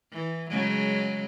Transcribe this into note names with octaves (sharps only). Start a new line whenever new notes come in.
E3
C#3 F#3 G#3